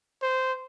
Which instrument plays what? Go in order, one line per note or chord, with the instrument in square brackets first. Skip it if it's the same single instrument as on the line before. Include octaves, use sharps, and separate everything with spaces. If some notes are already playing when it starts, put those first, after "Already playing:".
[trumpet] C5